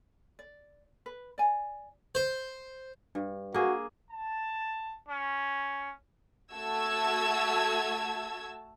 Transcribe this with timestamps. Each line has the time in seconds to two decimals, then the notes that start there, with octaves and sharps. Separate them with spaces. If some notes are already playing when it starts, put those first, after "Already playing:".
0.39 D5
1.06 B4
1.38 D5 G#5
2.15 C5
3.15 G2
3.54 A#3 F#4 G#4
4.11 A5
5.08 C#4
6.53 A3 F#4 A5 E6 G#6